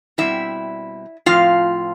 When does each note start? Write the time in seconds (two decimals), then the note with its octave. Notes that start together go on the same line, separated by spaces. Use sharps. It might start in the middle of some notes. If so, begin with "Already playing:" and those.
0.18 B2 G3 C4 E4 E5
1.26 A2 F3 C4 F4 F5